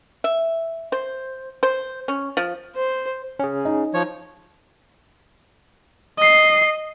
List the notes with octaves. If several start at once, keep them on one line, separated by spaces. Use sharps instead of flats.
E5
C5
C5
C#4
F3
C5
C#4 G#4
D#4
F3 C#5
D#5 C7